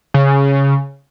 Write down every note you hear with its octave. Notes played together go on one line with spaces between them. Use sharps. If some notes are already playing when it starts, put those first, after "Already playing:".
C#3